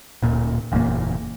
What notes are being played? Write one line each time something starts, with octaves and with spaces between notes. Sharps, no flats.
D1 A#2
F#1 E2 A#2 A#3